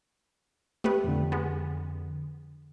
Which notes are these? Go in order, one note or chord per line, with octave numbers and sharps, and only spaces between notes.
A3 B3 G4 B4
F2 D3
G#3 B3